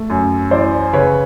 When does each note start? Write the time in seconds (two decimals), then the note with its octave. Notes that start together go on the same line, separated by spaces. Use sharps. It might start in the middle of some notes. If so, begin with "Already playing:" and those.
Already playing: A3
0.10 F#2
0.51 E3 C5 D5
0.93 C#3 B4 C#5